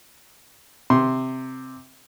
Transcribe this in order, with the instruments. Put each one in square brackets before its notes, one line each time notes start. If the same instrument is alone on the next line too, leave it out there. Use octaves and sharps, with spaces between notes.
[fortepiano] C3 C6